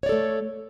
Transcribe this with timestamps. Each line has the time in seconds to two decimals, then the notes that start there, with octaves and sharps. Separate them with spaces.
0.03 C#5
0.06 D5
0.09 A4
0.12 A3